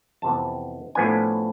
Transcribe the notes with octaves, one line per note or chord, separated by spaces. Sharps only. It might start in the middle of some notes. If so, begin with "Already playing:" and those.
F2 C3 E3 B3 A5
A2 F3 B3 D4 G#5